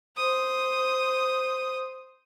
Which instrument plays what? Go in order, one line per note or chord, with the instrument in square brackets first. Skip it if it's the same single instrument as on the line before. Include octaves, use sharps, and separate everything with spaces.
[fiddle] C5 D#6